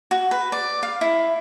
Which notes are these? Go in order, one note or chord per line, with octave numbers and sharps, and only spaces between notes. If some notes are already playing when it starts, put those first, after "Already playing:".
F#4
B4
D5
F5
E4